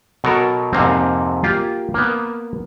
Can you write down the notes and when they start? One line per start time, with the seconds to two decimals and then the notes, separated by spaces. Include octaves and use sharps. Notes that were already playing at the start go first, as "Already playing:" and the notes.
0.24 B2 F#3 A4 A#4
0.73 F2 G#2 C3 A#3 C4
1.43 A#3 F4 G4
1.94 A#3 B3